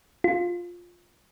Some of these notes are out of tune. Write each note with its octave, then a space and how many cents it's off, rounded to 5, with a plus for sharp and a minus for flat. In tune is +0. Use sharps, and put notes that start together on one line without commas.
F4 +10